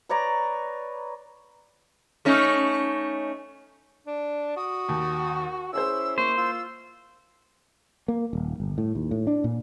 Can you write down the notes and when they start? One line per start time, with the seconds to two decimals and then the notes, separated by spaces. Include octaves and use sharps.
0.09 B4 C#5 D5 A#5
2.25 A3 C#4 D#4
4.07 D4
4.57 F#4 D#6
4.89 D#2
5.73 C#4 E4 G#4 C5 E6
6.18 A#3 C5 C#6
6.37 F4 E6
8.08 A#3
8.33 D#1
8.60 G1
8.78 A2
8.95 D#2
9.11 A2
9.27 D4
9.44 A#2